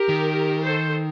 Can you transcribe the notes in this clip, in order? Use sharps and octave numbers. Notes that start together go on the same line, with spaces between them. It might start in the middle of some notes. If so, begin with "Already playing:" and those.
Already playing: G4 A#4
D#3
A4 C5